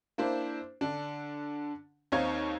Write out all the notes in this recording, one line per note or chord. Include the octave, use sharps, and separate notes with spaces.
A#3 D4 E4 C5
D3 D4
D#2 C4 D#4 C#5 F5 G#6